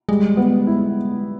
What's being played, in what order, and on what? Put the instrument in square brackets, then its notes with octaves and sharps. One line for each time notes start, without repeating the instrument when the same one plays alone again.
[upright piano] G3 [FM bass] G#3
[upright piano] B3
E4